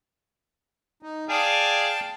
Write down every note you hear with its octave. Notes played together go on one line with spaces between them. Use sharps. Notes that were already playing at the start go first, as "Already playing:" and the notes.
D#4
G#4 D5 F5 G5 A5